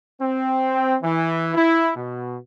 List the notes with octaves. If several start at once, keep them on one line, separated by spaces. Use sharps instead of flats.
C4
E3
E4
B2